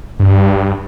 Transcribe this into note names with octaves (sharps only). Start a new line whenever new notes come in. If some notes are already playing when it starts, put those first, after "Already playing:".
G2